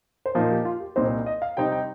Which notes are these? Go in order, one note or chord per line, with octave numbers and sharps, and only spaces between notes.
C5
A#2 F3 A#3 D#4 A#4
G4
F4
G4
C2 A#2 G3 C4 D#4 C5
D#5
F5
C3 G3 C4 D#4 G5
G5